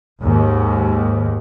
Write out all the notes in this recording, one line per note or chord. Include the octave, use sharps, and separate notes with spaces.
D#2 G#2